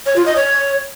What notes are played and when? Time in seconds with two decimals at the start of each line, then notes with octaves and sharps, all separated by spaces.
0.06 C#5
0.16 F4
0.26 D#5
0.36 C#5